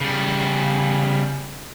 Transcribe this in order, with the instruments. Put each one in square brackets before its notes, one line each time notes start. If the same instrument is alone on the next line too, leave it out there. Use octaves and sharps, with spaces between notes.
[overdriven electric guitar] C#3 G3